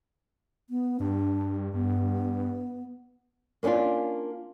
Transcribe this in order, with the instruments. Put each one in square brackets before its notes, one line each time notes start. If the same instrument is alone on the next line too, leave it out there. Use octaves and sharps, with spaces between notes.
[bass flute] B3
[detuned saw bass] G2 [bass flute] D4
[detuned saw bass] G2 [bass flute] B3
[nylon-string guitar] A#3 B3 C#4 D4 F4